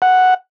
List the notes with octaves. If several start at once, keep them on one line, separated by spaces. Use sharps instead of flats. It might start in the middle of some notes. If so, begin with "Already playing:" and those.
F#5